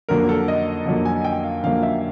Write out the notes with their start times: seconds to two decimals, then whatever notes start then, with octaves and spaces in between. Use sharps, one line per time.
0.09 F2 D3 F#3 A#3 A#4
0.29 A4
0.48 D#5
0.86 F2 D3 F#3 A#3
1.05 G#5
1.25 G5
1.44 F5
1.63 F2 D3 F#3 A#3 F5
1.83 E5